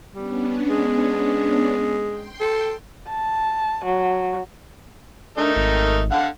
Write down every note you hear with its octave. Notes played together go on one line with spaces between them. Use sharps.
G3 B3 C#4 D4
G#3
G5 C6
A4
A5
F#3
A3 D4 D#4 A#4
G#1
D3 F5 F#5